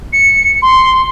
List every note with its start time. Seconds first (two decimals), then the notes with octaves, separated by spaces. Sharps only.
0.13 C#7
0.62 C6